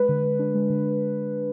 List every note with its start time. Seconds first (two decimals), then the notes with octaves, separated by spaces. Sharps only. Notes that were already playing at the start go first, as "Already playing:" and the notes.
Already playing: G#3 B4
0.09 D3
0.24 D3
0.39 D4
0.55 G#3
0.70 D3
0.85 D3